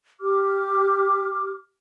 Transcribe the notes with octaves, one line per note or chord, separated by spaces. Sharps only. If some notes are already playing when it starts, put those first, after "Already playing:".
G4 D6 F6